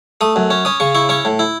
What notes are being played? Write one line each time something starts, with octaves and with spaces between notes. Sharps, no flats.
A3 D#6
F#2
C#4
C#4 D#6
C#3 C#6
E4 C#6
C#4 C#6
A2
E4